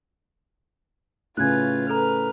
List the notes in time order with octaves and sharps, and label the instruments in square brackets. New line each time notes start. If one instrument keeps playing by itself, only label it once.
[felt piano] A2 C#3 C#4 [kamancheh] F4 B4 [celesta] F#6 G#6
[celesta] A4 A#5 [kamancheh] B4 F6